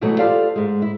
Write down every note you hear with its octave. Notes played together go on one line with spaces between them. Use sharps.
G#2 B2 E3 F#3 A3
F4 G4 A4 C5 D5 F5
G#2 G#3
E4